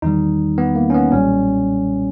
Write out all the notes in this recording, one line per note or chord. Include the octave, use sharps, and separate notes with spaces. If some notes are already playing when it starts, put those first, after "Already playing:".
E2 D#3 G3 D#4
B3
A#3
C#4
B3
B1 A#2 G3 C#4